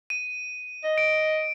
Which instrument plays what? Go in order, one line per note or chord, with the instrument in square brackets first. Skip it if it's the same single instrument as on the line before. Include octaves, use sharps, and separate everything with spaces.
[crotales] D#7
[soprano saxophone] D#5
[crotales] D7